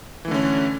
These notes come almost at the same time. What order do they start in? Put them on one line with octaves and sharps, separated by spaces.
E3 A3 D3 C#4